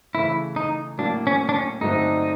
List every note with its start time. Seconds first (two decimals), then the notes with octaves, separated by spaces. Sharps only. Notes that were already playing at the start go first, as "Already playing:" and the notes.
0.14 C#3 E3 A3 C#4 E4
0.56 D#4
0.98 A2 F#3 A#3 D4
1.27 C#4
1.49 D4
1.54 C#4
1.81 G2 D3 F#3 A3 C4 D#4